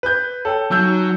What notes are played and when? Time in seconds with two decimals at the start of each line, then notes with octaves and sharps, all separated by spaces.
0.03 B4 G6
0.45 A4 C#5 G5 A5
0.71 F#3 D#4 A5 E6 G6